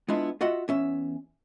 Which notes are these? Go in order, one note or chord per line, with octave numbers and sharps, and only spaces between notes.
G#3 B3 D4 E4 F4
F4 F#4 D#5 E5 F#5
E2 C#4 E5